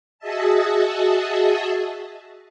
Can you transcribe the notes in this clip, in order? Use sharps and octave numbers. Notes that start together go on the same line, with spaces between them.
F#4 G#4 D#5 E5 A5